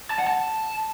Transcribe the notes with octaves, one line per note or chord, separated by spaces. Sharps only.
A5
F#5
A5